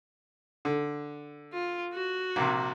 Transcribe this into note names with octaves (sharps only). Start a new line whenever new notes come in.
D3
F4
F#4
A#1 C3